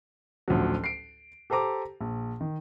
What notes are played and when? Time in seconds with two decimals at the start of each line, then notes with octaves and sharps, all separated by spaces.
0.48 A1 D2 F3 F#3
0.84 C7 D7
1.50 G4 A4 C5 A#5 D6
2.01 A#1
2.41 D#3